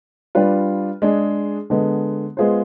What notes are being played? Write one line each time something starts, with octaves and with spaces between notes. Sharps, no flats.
G3 D4 F4 B4
G#3 D4 G#4
D3 G#3 B3
G#3 B3 F4 G#4 C5